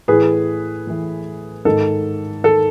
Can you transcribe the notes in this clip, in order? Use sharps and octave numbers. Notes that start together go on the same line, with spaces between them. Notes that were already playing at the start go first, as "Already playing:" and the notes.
A2 E3 G#4 B4
A2 E3
G#2 D#3 A4
D#3 A4